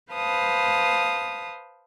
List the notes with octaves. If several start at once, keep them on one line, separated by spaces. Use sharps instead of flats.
B4 C5 F5 A5 D#6